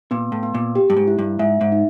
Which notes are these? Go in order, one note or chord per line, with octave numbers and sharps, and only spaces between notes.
A#2 B3
A2
B3
A#2
G4
G2
G#2
E4
G2
G#2 E5
G#2
D#4